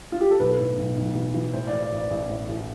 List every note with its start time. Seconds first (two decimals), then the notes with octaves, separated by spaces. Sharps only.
0.12 F4
0.21 G4
0.31 A4
0.40 B1 B4
0.59 A2
0.78 B1
0.97 B1
1.15 E3
1.34 E3
1.53 A2 C5
1.67 D5
1.73 E3
1.83 D5
1.92 A1
1.97 D5
2.10 A1
2.30 A2
2.49 A1